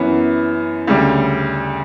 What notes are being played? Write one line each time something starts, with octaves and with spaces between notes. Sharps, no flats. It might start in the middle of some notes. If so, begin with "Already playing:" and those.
Already playing: F#2 E3 B3
D2 C#3 G3